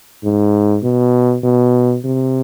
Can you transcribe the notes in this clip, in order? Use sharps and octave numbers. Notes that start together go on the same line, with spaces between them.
G#2
B2
B2
C3